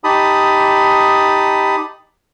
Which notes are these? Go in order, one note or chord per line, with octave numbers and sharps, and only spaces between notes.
D#4 G4 A5 B5 D#6